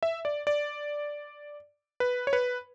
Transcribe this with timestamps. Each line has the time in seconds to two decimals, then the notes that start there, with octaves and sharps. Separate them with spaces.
0.03 E5
0.25 D5
0.47 D5
2.00 B4
2.27 C#5
2.33 B4